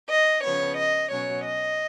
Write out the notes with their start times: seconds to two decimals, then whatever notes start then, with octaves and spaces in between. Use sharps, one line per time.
0.09 D#5
0.43 C#3 F3 B3 C#5
0.78 D#5
1.11 B2 F#3 C#4 C#5
1.45 D#5